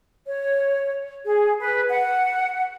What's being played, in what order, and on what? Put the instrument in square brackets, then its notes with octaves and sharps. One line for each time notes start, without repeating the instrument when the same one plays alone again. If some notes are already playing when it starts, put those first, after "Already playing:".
[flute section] C#5
G#4
B4
F#5